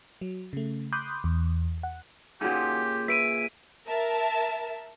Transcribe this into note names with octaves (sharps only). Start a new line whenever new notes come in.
F#3
C#3 A3
B5 C6 D6 D#6 F#6 G6
E2
F#5
A#2 C#3 D#4 F#4 G4
B4 E5 B6 D7 D#7
A#4 E5 A5